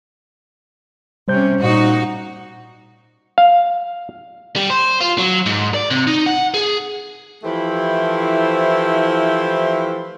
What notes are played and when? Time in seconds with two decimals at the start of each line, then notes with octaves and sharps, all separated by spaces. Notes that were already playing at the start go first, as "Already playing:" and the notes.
1.28 C3 G3 C#4 C5 G6
1.60 A#2 D#4 F#4
3.38 F5
4.56 G3
4.70 C5
5.01 F4
5.18 F#3
5.46 G#2
5.74 D5
5.91 C3
6.07 D#4
6.26 F#5
6.54 G#4
7.44 E3 F3 A3 E4 G4 C5